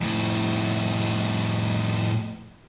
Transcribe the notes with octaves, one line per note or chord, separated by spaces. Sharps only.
F2 A2